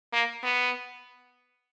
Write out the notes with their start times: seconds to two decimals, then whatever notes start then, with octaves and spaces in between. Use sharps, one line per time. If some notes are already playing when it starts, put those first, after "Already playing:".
0.13 A#3
0.43 B3